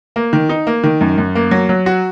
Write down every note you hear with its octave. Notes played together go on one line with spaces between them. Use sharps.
A#3
D#3
D#4
A#3
D#3
F#2
F#2
A#3
F#3
F#3
F#4